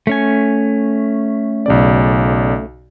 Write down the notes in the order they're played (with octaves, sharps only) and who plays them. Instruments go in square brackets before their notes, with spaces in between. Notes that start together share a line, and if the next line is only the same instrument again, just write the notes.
[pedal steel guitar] A3 C#4 G#5
[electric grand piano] B1 C#3 D5